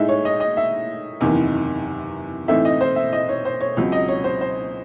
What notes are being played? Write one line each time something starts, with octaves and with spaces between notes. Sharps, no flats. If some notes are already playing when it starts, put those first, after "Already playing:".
Already playing: A2 G#3 D#4 E5
C#5
D#5
D#5
E5
F#1 E2 C3 D#3
A2 E3 A3 C4 D#4 E5
D#5
C5
E5
D#5
C#5
C5
C#5
C#2 C#3 F#3 C4
D#5
C#5
C5
C5